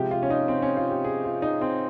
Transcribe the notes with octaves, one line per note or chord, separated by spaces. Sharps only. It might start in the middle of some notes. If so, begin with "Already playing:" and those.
Already playing: C3 F3 G#3 G4
F4
C#4
D#4
C4
C#4
F4
G4
G#4
F4
D#4
C4